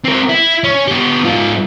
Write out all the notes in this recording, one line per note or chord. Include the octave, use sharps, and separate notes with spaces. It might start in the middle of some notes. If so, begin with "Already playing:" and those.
C4 A#4
E4
C#4
B3 G4
G#2 F4